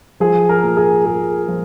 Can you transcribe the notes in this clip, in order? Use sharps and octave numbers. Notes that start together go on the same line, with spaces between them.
F3 G#4
A#4
A#2
G#4
A#2 G#4
F3